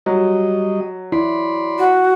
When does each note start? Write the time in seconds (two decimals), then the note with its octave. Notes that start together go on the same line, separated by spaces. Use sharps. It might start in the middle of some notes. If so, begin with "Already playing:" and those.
0.06 F#3 G3 D#5
1.12 E4 D5 B5 C6
1.78 F#4